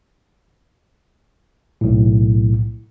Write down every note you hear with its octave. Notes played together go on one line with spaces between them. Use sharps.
B1 A2